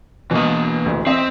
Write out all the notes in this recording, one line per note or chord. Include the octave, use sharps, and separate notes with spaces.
B2 E3 A#3 D#5
A1 D2
C4 D#5 E5